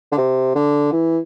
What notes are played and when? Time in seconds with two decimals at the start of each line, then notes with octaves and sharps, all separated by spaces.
0.12 D3
0.18 C3
0.55 D3
0.92 E3